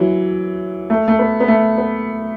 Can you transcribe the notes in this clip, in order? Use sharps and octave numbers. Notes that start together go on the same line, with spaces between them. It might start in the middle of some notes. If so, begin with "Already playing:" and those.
Already playing: E3 F#3
A3
A3
B3
B3
A3
B3